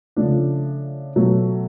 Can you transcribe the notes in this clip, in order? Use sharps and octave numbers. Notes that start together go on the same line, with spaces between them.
C#3 F3 A3 D4
B2 F#3 A3